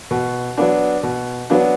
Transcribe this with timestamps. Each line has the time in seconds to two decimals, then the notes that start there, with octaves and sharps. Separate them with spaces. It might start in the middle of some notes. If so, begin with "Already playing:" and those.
0.11 B2
0.57 F#3 B3 D4
1.03 B2
1.50 F#3 B3 D4